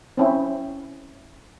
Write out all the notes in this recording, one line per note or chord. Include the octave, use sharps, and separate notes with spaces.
C4 C#4 E4